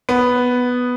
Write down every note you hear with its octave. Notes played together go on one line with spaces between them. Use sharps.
B3